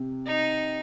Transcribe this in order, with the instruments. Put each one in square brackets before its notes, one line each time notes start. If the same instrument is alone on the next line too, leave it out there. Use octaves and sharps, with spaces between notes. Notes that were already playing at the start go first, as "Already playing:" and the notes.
Already playing: [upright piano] C3
[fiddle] D#4